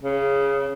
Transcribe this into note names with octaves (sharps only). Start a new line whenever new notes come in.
C#3